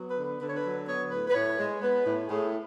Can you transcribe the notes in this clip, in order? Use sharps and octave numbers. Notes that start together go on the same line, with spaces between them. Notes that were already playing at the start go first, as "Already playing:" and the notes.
Already playing: F#3 B3
B4
D3
B4
D3 B4
C#5
B4
F#3
B3 C#5
A2 B4
B4
A2 C#5
G#3
B3 B4
A2
A2 G#4